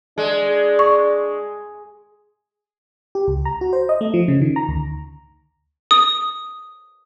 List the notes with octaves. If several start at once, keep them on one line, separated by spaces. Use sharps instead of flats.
G#3 D4
C#6
G4
C#2
A#5
F#4
C5
D#5
A3
F3
C#3
D#3
A#5
D2
D#6